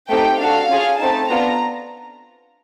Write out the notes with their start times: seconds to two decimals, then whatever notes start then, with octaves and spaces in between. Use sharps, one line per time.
0.09 A3 C4 D#4 G4 G5
0.39 D4 F#4 A4 F5
0.69 C#4 F4 G#4
0.99 A3 C4 D#4 A5
1.29 B3 D4 F4 A#5